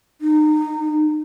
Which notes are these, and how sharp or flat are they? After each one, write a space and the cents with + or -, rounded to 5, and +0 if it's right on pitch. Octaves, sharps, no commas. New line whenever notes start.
D#4 -25